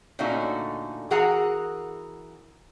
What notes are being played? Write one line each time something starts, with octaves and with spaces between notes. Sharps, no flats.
A#2 D3 A3 C#4 D#4 F#4
E3 F#4 G#4 A#4 F#5 A#5